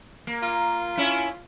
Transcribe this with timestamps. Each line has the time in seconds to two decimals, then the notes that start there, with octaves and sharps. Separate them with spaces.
0.27 A#3
0.43 F4
0.97 C#4 E4